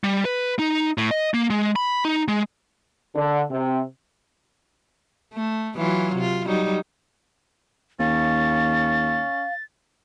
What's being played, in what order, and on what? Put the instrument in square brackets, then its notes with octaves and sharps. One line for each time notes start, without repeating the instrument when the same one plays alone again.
[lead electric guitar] G3
B4
D#4
A2
D#5
A#3
G#3
B5
D#4
G#3
[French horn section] D3
C3
[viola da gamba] A3
E3 F#3 F4
C3 F4
F#3 G3 D#4
[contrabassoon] D#2 [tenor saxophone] C#4 [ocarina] F5 [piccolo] A6